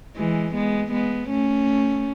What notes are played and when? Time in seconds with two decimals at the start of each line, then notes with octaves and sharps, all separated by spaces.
0.16 E3 G#3
0.54 G#3 B3
0.91 G#3 B3
1.29 A3 C#4